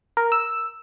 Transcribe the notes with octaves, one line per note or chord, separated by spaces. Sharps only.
A#4
E6